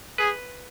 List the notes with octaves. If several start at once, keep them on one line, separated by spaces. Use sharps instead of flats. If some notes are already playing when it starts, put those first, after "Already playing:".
G#4 B4